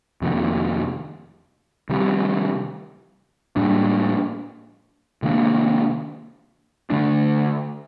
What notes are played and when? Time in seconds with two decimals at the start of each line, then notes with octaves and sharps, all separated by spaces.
0.22 F2 C3 D#3 A#3
1.89 C3 D#3 G3
3.56 A2 G3 A#3 D4
5.22 C3 D#3 A#3 D4
6.90 D3 A3 D4